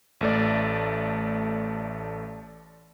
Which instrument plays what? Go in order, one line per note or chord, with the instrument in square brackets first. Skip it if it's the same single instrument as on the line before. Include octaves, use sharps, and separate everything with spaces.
[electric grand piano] A1 A3 D5